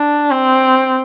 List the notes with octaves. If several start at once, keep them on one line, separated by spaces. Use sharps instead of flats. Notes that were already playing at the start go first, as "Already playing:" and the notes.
Already playing: D4
C4